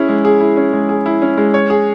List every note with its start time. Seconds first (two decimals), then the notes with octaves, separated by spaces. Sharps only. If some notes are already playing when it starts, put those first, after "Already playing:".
Already playing: C#4 E4 G#4
0.09 G#3
0.25 G#4
0.40 E4
0.57 C#4
0.73 G#3
0.89 G#4
1.06 E4
1.22 C#4
1.38 G#3
1.54 C#5
1.70 G#4